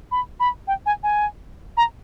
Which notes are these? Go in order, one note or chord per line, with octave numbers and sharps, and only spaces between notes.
B5
B5
G5
G#5
G#5
A#5